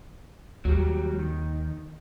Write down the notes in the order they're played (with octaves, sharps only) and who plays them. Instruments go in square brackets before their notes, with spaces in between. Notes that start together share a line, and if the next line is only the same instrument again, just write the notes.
[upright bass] D#2 [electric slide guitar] F#3 G3
[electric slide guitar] D#3